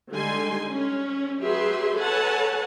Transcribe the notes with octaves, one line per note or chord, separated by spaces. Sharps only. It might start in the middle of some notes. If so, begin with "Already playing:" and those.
D3 G3 G#3 D#4 G#5 C6
C#4
F#3 G4 G#4 B4 E5 C6
A4 B4 C#5 F#5 G#5 A5